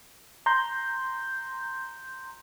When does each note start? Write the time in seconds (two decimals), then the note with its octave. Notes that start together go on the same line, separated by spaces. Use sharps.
0.46 A#5 C6 G6